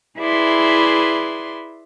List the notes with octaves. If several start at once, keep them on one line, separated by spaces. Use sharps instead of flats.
E4 G#4 B4 D5 E5 C6